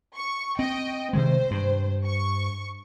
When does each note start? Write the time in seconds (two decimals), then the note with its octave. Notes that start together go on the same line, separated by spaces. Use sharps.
0.16 C#6
0.59 C4 D#5 G5
1.13 C3 D#3 G#3 C5
1.51 G2
2.06 C#6